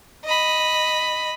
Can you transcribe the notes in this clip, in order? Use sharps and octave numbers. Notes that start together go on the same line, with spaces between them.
D#5 B5